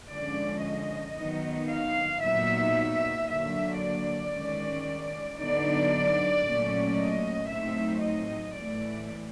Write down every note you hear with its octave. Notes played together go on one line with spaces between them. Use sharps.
D3 F3 G#3 C#4 D5
D#5
D#3 F#3 B3 D#4
F5
A#2 F#3 B3 D#4 E5
D3 F#3 A#3 E5
D5
D#3 G#3 C#4
D3 F#3 B3 D#4 D5
A#2 F#3 A3 C#4
D#5
A2 F#3 A3 C4 D#4 E5
D#5
A2 E3 A3 D5